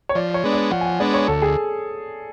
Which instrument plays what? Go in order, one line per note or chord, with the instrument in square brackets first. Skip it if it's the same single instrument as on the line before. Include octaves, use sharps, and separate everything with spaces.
[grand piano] C#5
[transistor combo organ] F3 [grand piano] D5
[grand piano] C#5
[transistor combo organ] G#3 B3 D4
[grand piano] D5
[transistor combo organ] F3 [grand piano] F#5
[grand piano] G#5
F#5
[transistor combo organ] G#3 B3 D4 [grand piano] D5
[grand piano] C#5
[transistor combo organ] D2 [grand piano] A4
[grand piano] G#4